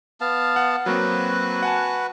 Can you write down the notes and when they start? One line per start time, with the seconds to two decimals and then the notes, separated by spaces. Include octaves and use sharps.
0.21 B3 F5 A5
0.56 F#5
0.86 F#3 A#3 C4 F#4 B4
1.62 F#5 G#5 A5